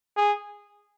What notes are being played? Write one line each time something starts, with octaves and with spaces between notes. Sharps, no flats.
G#4